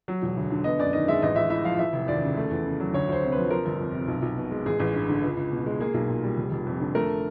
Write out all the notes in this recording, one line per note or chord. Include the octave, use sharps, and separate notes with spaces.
F#3
E1
D2
D3
B3 D#5
F#2 D5
D#3 D#5
G#3 E5
A1 D#5
A1 E5
A2 E5
F3 F5
E3 E5
F1
D#2 D5
C#3
A3
E2
C#3
F#3
D2 C#5
D2 C5
C3
F3 B4
F3 A#4
G1
F2
C3
B1
B1
B2
G#3
A1 G#4
A1
G2
D3
C#2
C#2
B2
G#3
A#3 G#4
B1
A#2
G3
F1
F1
F2
D3
A3 A#4